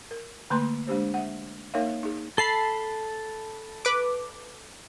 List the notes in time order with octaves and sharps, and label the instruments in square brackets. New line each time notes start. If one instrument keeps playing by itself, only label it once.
[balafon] A#4
D3 A3 A#3 B4 A#5 C6
G#3 D4 G4 C5
E5 F#5
A#3 D#4 A#4 C#5 E5 F5
D#4 G#4
[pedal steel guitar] A4 A5 B5 [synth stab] C7
[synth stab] B4 D6